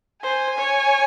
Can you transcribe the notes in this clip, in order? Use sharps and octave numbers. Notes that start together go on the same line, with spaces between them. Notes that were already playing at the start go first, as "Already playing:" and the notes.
C5 G#5
C#5